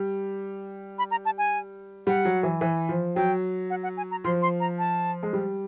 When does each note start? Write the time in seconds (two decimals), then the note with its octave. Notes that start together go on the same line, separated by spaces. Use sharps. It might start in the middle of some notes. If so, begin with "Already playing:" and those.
Already playing: G3
0.99 B5
1.11 A#5
1.25 A5
1.38 G#5
2.07 G3 F#5
2.25 F#3
2.43 E3
2.61 E3
2.89 F3
3.16 F#3 G5
3.70 F#5
3.83 F#5
3.97 G#5
4.11 A#5
4.24 F3 C6
4.42 C6
4.60 A#5
4.79 A5
5.23 G#3
5.33 G3